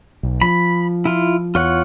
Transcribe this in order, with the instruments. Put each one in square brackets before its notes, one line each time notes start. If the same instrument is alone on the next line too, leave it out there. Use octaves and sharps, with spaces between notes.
[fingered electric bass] B1
[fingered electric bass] F3 [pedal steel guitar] B5
[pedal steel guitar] E4 F4
[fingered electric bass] E2 [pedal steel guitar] F4 C#5 F#5